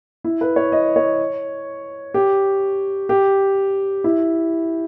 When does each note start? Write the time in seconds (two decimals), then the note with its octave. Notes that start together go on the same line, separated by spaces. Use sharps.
0.24 E4
0.41 B4
0.56 C#5
0.72 D#5
0.96 C#5
2.14 G4
3.09 G4
4.04 E4